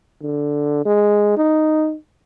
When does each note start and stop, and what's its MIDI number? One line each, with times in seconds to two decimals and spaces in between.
0.22 0.82 50
0.85 1.35 56
1.37 1.96 63